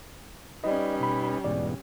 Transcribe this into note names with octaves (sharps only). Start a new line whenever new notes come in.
G3 C#4 D#4 B4 D5 D#5
B2 B5
E2 G#2 B2 D5